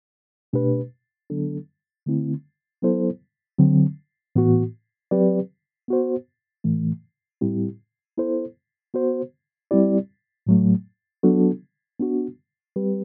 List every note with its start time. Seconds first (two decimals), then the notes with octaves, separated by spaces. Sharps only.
0.53 B2 A3 D4 G4 B4
1.30 D3 F#3 B3 D4 A4
2.07 D3 A3 C4 E4
2.82 F#3 B3 E4 A4 C5
3.59 D3 F#3 C4
4.36 A2 E3 B3 F#4
5.11 F#3 C4 G4 B4 D5
5.88 B3 F#4 C5
6.64 A2 E3 A3
7.41 A2 G3 C4 E4 G4
8.17 B3 E4 A4 C5
8.94 B3 F#4 C5
9.71 G3 C4 E4 G4 D5
10.47 A2 F#3 A3
11.23 F#3 B3 D4 F#4 A4
12.00 B3 D4 F#4
12.76 G3 C4 G4 B4